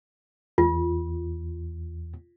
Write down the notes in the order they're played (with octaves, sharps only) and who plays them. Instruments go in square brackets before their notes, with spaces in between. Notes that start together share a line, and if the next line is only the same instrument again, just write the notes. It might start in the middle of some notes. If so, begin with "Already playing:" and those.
[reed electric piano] E2 [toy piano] F4